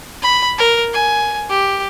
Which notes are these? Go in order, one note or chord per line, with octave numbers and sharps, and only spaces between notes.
B5
A#4
G#5
G4